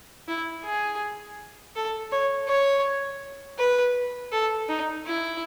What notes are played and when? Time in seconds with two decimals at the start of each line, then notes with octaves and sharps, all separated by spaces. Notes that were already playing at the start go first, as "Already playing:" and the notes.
0.28 E4
0.64 G#4
1.76 A4
2.12 C#5
2.48 C#5
3.58 B4
4.32 A4
4.69 D#4
5.06 E4